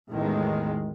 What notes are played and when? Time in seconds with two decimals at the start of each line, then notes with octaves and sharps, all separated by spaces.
0.12 A1 E2 D#3 G#3